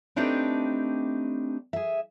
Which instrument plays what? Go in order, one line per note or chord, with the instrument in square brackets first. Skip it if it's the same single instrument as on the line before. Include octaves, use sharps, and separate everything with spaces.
[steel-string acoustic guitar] A3 C4 D4 D#4 G4 B4
G#4 E5